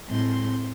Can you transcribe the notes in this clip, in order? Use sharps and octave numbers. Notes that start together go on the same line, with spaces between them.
A2 G#3 C4 C6